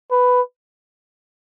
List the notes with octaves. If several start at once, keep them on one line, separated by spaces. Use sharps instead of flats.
B4